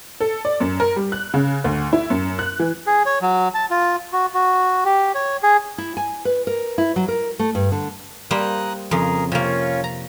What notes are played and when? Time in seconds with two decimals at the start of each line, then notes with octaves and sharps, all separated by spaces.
0.20 A4
0.45 D5
0.60 F#2
0.80 A#4
0.96 G3
1.12 F#6
1.34 C#3
1.64 D2
1.93 E4
2.10 F#2
2.39 F#6
2.60 E3
2.87 G#4
3.06 C#5
3.22 F#3
3.54 A5
3.70 F4
4.13 F#4
4.34 F#4
4.85 G4
5.15 C#5
5.43 G#4
5.78 E4
5.97 G#5
6.25 B4
6.47 A#4
6.78 E4
6.96 F#3
7.08 A#4
7.39 A3
7.55 G2
7.72 D3
8.31 G3 A#3 A#4 C5 D#6 F#6
8.91 F2 C#3 G#4 A#4
9.32 C3 A#3 C#4 F4 C#5
9.84 A#5